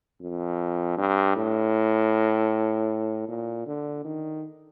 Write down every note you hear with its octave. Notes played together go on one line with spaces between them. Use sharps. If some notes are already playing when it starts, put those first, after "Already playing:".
F2
G2
A2
A#2
D3
D#3